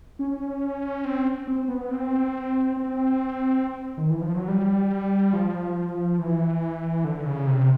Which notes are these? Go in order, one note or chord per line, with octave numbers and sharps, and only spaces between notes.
C#4
C4
C4
B3
C4
C4
D#3
E3
F3
F#3
G3
F3
E3
D3
C#3
C3